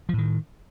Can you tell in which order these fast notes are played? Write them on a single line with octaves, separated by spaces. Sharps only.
F3 A2 D#3